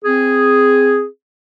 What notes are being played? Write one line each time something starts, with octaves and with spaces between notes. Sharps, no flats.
C4 G#4